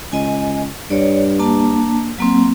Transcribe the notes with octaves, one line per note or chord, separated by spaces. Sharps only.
C#2 D#5 G#5
G2 C#5 D5
A#3 D4 A5
F#3 A#3 C4